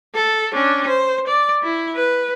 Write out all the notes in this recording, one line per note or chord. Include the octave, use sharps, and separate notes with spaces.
A4
C#4 D4
C5
D5
E4
B4